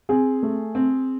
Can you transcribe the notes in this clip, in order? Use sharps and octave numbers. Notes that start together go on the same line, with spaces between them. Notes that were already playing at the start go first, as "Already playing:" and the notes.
C4 G#4
A3
C4